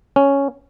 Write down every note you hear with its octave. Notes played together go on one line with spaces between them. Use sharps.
C#4